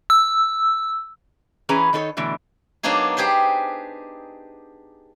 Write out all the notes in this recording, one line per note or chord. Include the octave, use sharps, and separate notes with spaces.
E6
E3 C#4 G#4 B4 A#5
D#3 D#4 A4 B4 C#5
B2 D3 E3 A3
F#3 A#3 B3 D4 D#4 G#4
G4 G#4 B4 C5